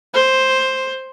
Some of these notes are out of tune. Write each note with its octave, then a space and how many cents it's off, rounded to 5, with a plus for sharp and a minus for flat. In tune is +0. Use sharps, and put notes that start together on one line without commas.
C5 +5